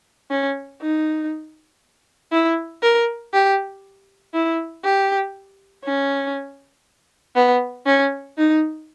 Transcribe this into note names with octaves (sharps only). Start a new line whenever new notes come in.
C#4
D#4
E4
A#4
G4
E4
G4
C#4
B3
C#4
D#4